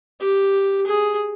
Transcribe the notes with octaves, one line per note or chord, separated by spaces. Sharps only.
G4
G#4